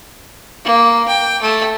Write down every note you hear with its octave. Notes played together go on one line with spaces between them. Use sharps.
A#3
G5
A3